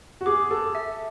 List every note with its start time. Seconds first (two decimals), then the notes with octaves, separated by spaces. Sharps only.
0.21 F#4
0.26 G#4 D6
0.51 A4 D6
0.75 E5